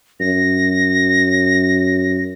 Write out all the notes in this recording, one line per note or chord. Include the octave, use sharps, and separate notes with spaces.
F#2 A#6